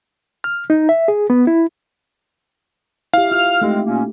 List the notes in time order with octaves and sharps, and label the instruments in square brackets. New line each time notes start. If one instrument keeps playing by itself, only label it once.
[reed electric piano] F6
D#4
E5
G#4
B3
E4
[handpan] E4 G4 [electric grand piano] F5
[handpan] F4 [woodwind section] F6
[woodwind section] G#3 C4 [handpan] A3 D#4 G4
[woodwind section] A#2 A#3 C#4